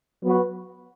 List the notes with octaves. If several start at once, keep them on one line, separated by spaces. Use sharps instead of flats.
F#3 B3 F#4 B4